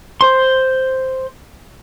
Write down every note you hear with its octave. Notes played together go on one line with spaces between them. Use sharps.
C5 C6